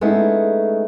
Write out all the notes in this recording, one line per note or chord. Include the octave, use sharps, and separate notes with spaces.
G#3 A3 B3 C#4 D#4 E4